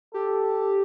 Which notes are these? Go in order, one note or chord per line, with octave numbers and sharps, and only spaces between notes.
G4 A4